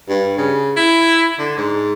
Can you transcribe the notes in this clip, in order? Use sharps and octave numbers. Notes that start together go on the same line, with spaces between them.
G2
C#3
E4
D3
G#2